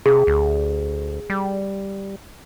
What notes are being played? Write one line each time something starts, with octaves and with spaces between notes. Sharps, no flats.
C3 G#4
D2
G3